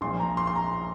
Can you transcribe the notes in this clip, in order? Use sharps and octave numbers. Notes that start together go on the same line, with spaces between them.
A#1 A#2 F3 C6
A#5
C6
C6
A#5